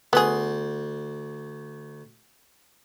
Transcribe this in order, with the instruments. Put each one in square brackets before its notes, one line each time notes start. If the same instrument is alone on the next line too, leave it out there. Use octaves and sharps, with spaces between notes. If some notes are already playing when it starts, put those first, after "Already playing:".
[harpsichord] D2 C6 [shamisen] B3 G#4